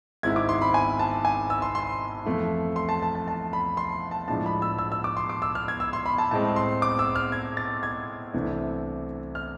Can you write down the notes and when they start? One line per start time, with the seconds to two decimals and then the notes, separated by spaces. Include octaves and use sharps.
0.23 G#1 G#2 G#3 C4 E4 G#6
0.36 D6
0.49 C6
0.62 B5
0.74 G#5
0.99 A5
1.25 G#5
1.50 E6
1.62 C6
1.75 C6
2.25 F2 E3 A3 E4
2.76 C6
2.89 A5
3.02 A5
3.15 A5
3.28 A5
3.53 B5
3.77 C6
4.11 A5
4.28 A2 F3 G#3 D4 A5
4.46 B5
4.62 E6
4.79 E6
4.92 E6
5.04 D6
5.17 C6
5.30 D6
5.42 E6
5.55 F6
5.68 G#6
5.80 E6
5.93 C6
6.06 B5
6.18 A5
6.31 A2 G#3 C4 A5
6.56 C6
6.82 D6
6.99 E6
7.15 F6
7.32 G#6
7.57 A6
7.83 G#6
8.34 C2 C3 E3 A3 D4
9.35 F6